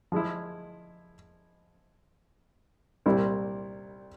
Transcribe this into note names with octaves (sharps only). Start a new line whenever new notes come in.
F3 G#3 E4
C2 A#2 G3 C4 E4